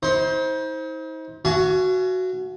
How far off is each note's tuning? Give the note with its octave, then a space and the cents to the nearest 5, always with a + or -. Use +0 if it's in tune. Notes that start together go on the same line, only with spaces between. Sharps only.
D#4 +45 C5 +10
F#4 +0 F5 -45 G#5 +30